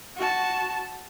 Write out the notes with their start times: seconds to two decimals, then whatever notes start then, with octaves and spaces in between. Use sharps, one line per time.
0.17 F#4 A5